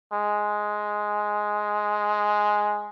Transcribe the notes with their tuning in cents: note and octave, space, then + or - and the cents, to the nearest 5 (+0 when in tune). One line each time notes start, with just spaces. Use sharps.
G#3 +5